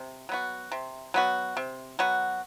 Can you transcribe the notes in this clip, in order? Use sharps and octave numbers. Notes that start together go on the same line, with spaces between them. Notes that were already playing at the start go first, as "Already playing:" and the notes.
Already playing: C3
F#3 B3 F#4
C3
F#3 B3 F#4
C3
F#3 B3 F#4